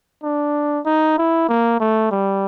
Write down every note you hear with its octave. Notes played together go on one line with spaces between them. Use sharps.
D4
D#4
E4
A#3
A3
G3